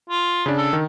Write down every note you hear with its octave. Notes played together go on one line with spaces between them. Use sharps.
F4
C#3 D4
A4
D#3